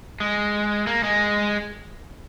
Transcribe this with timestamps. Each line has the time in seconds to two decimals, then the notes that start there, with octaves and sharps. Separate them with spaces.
0.20 G#3
0.87 A#3
1.03 G#3